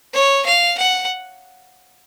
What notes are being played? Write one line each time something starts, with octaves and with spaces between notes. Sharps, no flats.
C#5
F5
F#5